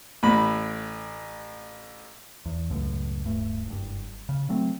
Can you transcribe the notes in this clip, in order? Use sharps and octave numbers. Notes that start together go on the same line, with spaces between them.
A1 A2 B5
E2
C#2 F#2 A2
D1 G2 A3
F#1 G2
C#3
F#3 A3 C4